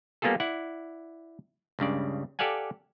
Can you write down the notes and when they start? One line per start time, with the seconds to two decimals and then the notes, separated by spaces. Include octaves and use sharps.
0.22 G3 A#3 B3 F4 G#4 A4
0.40 E4 D5 F#5
1.79 C#2 G2 C#3 D5
2.39 G4 A4 D5 F5 F#5 G#5